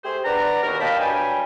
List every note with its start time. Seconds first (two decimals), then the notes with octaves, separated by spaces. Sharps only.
0.04 A3 G4 G#4 C5
0.25 D4 B4 D5 F#5 A#5
0.63 D#2 B2 A#4
0.80 A#4 D#5 F5 G5 A5 B5
0.99 G2 F#3 G3 G5 G#5